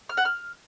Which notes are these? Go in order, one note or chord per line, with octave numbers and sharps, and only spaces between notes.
F6
F#5
F6